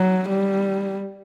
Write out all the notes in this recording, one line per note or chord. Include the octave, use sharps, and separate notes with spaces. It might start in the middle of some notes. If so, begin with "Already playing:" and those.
Already playing: F#3
G3